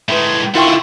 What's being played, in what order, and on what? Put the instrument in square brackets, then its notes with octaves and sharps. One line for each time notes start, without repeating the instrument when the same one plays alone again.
[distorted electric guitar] A2 G#3 [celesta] B4 E5
[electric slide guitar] E4 F4 [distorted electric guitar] A4 F#5 [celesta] A#4 G5 C#6 [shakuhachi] C6